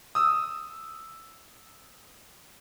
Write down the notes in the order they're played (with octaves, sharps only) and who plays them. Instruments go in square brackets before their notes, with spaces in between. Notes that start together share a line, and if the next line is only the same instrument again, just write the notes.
[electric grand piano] D#6 E6